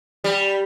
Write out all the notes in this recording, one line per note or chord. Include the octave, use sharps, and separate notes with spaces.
G3